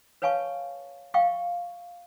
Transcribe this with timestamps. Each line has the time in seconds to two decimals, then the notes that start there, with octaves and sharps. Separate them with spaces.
0.22 B4 C#5 F5 G#5 A5 C#6
1.14 E5 F5 G5 C#6